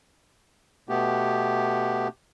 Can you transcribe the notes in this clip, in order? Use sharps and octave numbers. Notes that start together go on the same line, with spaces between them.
B2 A3 B3 G4